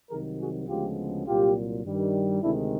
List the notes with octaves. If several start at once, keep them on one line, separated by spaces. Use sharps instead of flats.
C2 C3 D#3 F#3 G#4 A#4
F#4 G#4
D2 C#3 F3 G#3 B3 F4 G4
C2 A#2 F#3 F4 G4
G2 D#3 G3
D2 C3 D#3 G#3 D4 E4